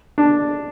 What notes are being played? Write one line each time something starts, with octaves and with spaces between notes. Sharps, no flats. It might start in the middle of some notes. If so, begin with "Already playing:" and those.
D4